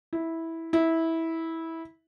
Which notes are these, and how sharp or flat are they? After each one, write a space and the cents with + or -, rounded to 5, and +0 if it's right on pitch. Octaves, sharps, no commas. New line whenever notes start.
E4 -10
E4 -15